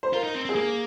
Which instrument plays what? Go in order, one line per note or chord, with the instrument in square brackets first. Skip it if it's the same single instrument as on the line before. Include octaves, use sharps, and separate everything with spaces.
[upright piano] C5
[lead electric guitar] F4 [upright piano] A#4
[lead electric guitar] D#4
C4
[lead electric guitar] C4 [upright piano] G#4
[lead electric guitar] A#3 [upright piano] A#4